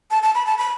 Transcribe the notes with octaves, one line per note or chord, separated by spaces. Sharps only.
A5
A5
B5
A5
B5